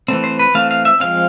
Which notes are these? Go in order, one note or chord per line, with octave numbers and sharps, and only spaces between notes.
E3 A3 C4
C5
B4
E3 A3 C4 F5
F5
E5
F3 G#3 C4 F5